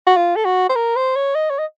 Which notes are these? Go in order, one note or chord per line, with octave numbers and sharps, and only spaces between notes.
F#4
F4
A4
F#4
C5
A#4
C5
C#5
D#5
C#5
D#5